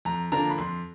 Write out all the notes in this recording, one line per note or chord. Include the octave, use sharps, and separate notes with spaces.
F2 A#5
D3 F3 A#3 D4 A#5
B5
F2 C6